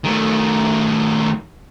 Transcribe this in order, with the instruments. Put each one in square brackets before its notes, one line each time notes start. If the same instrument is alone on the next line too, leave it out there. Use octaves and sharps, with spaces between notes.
[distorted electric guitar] D#3 A3